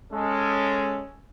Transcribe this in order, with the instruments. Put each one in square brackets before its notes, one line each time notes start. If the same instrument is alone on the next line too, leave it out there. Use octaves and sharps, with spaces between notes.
[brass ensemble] G#3 C#4 A4